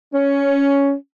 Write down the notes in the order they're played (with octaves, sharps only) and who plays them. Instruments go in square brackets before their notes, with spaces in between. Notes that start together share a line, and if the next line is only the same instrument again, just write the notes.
[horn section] C#4